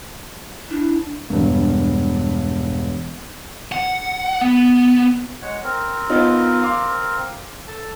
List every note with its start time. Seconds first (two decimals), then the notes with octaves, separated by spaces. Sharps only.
0.70 D4 E4
1.30 E1 G2
3.72 F#5
4.41 B3
5.42 G#3 C#5 F#5
5.63 C4 A#4
6.10 B3 D#4 F4
6.62 F5 C6 D6
7.67 A4 A5